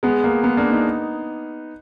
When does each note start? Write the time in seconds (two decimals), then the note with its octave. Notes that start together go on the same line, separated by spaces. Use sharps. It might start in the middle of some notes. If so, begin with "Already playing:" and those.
0.03 G#3 B3
0.24 A#3
0.44 G#3 B3
0.57 A#3 D4
0.71 B3 D#4